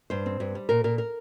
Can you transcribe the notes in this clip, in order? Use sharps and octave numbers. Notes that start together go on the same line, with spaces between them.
G2 C5
C4
G2
G3
A#2 A#4
A#2 A#4
A#4